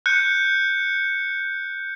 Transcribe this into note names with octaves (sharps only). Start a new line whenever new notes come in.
F#6 G6 C#7